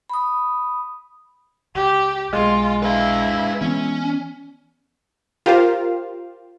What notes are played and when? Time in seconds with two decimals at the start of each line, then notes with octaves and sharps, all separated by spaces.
0.10 B5 D#6
1.75 C#2 G4
2.33 B1 G#3 F4
2.83 E4 B4 F5
3.61 E3 B3 C#4
5.46 F4 G4 A#4 C5 F5